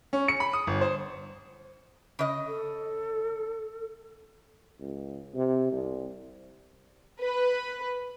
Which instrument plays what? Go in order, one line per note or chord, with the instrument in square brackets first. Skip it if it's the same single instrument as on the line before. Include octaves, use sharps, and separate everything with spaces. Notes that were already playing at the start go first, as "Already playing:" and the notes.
[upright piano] C#4
C#7
B5
D#6
G1
C5
[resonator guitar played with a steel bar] C#3 D#5
[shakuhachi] A4
[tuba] C#2
C3
C2
[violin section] B4